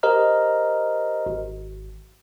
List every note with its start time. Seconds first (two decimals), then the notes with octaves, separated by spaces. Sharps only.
0.03 G4 A#4 C5 D#5 A#5 F6
1.26 G#1